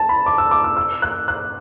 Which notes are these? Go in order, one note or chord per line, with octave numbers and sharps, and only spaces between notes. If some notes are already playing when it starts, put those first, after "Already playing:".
Already playing: A5
B5
D6
E6
D6
E6
E6
F#6
F#6